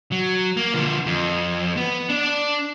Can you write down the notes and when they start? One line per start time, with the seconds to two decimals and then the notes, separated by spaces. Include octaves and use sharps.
0.12 F#3
0.57 A#3
0.74 D3 F3
1.06 F2
1.77 B3
2.09 D4 D5